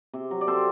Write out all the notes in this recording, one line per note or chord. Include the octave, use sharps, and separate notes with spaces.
C3
F#3
D5
C4 A4 C5